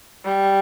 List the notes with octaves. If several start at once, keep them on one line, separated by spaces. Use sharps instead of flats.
G3